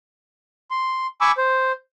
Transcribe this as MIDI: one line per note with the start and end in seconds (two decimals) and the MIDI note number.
0.71 1.07 84
1.21 1.32 80
1.21 1.32 83
1.21 1.32 85
1.21 1.32 86
1.21 1.32 88
1.37 1.72 72